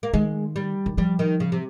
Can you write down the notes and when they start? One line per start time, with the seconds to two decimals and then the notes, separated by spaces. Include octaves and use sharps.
0.03 A#3
0.14 D#3 G#3
0.56 G3
0.86 D#3
0.97 F3 G3
1.19 D#3
1.40 C#3
1.52 C3